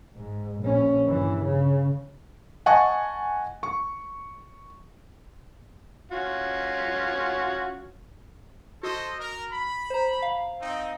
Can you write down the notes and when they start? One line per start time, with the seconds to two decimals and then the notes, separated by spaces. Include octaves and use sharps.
0.16 G#2
0.61 A#1 C#4
1.05 G2 E3
1.45 C#3
2.66 D#5 F#5 G#5 A5 C#6
3.63 C#6
6.11 C#4 F4 F#4
8.83 F#4 A4 C5 D#5
9.20 A#4
9.52 B5
9.90 C5 A#5
10.22 F5
10.61 C4 D#4 D#5